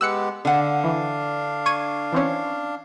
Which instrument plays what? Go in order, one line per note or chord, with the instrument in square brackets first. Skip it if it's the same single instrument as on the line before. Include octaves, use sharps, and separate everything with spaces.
[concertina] G#3 B3 G4 [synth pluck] E6 F#6 C#7
[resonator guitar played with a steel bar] D3 F#5 [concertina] D4 F5
[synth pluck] E3
C#6 G#6 D#7
E3 C4 C#4